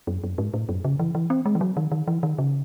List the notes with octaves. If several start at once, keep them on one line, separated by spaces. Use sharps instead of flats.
F#2
F#2
G#2
A2
F#2
C#3
E3
E3
C4
G#3
E3
F#3
D#3
D#3
E3
D#3
C#3